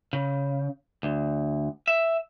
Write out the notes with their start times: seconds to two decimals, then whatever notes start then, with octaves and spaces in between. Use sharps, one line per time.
0.13 C#3
1.03 D2
1.88 E5